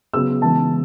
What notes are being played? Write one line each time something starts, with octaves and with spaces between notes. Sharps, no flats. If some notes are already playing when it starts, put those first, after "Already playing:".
C#3 F#3 B3 E6
C#3 E3 G#3 B3 A5